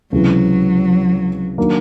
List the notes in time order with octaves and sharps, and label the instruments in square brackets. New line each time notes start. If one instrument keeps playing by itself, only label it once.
[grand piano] C#2 C3 E3 [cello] F#3
[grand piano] D#3 F#3 A#3 D4